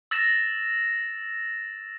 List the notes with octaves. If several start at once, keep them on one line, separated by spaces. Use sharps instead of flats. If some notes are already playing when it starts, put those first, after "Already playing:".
E6 A6 A#6 E7